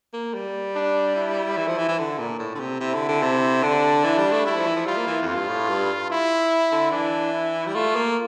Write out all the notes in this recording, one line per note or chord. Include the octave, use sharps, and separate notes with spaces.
A#3
G3
D4
E4
E3
F3
E3
E3
D3
A#2
A2
D3
C3
C3 E4
D3
D3
C3
D3 D4
E3
G3
A3
G3 E4
F3
E3
F3
G3 F4
A#3
E3
F2
F4
G2
A2
G2
E4
D3
E3 D4
E4
G3
A3 F4
A#3